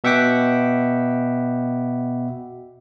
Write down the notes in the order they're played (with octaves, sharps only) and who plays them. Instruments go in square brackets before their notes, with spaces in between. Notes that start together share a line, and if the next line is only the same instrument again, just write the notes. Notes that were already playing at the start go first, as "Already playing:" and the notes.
[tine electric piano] B2 E5 F#5 G5 D6 B6